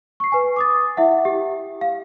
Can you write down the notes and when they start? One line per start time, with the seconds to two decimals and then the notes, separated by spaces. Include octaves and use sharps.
0.20 C#6 C7
0.32 B4 G#5
0.56 D6 D#6 A6
0.97 E4 E5 F#5
1.25 G4
1.81 F5